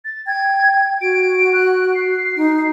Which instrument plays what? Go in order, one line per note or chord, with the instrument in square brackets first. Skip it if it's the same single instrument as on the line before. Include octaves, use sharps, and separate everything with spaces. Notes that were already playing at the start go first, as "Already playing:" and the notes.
[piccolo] A6
[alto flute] G5 [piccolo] G#6
[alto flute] F#4 [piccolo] D7
[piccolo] F#6
C7
[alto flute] D#4